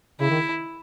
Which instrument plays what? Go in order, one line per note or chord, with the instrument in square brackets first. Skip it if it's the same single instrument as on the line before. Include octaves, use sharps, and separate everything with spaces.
[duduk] C#3 [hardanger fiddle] E4
[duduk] D#3